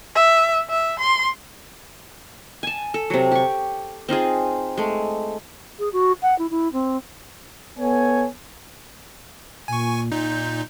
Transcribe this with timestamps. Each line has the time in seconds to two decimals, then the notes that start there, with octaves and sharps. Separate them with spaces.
0.15 E5
0.70 E5
1.00 C6
2.63 G#5 A5
2.94 A4
3.10 C3 F#3
3.32 G4 C#6
4.09 C4 D#4 F4 G#4
4.78 G#3 A3
5.79 G#4
5.93 F#4
6.22 F#5
6.39 E4
6.50 E4
6.73 C4
7.79 B3 A4 C#5 G#5
9.68 A#2 G#5 C#6
10.12 A#2 D#4 G6